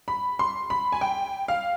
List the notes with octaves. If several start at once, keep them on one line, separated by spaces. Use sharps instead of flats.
B5
C6
B5
G#5
G5
F5